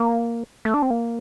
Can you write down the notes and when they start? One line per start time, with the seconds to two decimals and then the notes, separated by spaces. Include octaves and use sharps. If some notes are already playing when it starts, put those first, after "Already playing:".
Already playing: A#3
0.65 A3
0.74 D4
0.82 C4
0.90 A#3